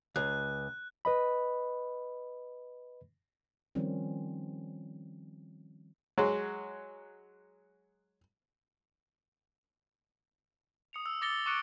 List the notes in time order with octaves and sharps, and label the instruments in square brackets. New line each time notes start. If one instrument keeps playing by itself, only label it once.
[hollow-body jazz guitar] C#2 [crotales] F#6
[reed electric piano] B4 D#5 B5
[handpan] D#3 F3 G3 C4 C#4
[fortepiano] F#3 G#3
[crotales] D#6 C#7 F7
E6
D6 E6 A6 A#6 C#7 G7
C#6 D6 F#6 C#7 D7